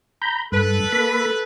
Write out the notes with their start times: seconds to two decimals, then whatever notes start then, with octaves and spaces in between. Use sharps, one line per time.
0.22 A#5 B5 G6
0.52 G2 A4 B4
0.92 A#3 B5